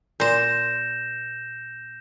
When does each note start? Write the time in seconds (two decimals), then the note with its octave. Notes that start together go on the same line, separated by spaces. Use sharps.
0.20 A#2 C5 G6 A#6 E7